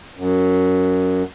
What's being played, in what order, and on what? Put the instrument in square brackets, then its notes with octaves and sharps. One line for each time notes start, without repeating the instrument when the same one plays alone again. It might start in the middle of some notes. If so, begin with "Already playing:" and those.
[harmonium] F#2